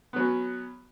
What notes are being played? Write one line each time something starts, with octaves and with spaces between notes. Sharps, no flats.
F#3 B3 C#4